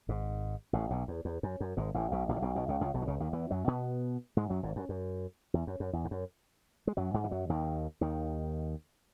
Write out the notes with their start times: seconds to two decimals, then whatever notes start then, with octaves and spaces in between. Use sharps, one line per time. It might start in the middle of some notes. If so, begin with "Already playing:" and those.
0.09 G#1 G#2
0.73 A1 A2
0.90 B1 B2
1.08 E2
1.25 E2
1.43 F#2
1.60 F#2
1.77 G#1 G#2
1.94 A1 A2
2.12 B1 B2
2.29 A1 A2
2.36 C#3
2.42 B1 B2
2.55 B1 B2
2.68 C#2 C#3
2.81 C#2 C#3
2.94 B1 B2
3.02 D#3
3.08 C#2 C#3
3.20 D#2 D#3
3.33 E2 E3
3.51 F#2 F#3
3.67 B2 B3
4.37 G#2 G#3
4.50 F#2 F#3
4.63 G#1 G#2
4.76 F#2
4.89 F#2
5.54 E2
5.67 F#2
5.80 F#2
5.93 E2
6.05 G#2
6.11 F#2
6.87 G#3
6.97 F#2 F#3
7.14 G#2 G#3
7.24 E3
7.31 F#2 F#3
7.50 D#2 D#3
8.01 D#2 D#3